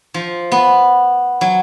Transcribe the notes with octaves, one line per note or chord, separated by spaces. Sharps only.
F3
B3
F#3